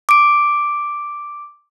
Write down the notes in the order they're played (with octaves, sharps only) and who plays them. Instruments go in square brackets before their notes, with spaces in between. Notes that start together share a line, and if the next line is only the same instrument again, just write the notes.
[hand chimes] D6 D7